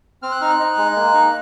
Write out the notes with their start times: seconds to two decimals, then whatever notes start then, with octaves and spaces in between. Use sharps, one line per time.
0.23 C4 F6
0.32 F#6
0.41 D#4 F6
0.50 F#6
0.59 D#4
0.77 G#3
0.96 A#3
1.14 D#4